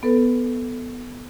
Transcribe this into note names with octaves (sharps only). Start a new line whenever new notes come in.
B3 A4 B4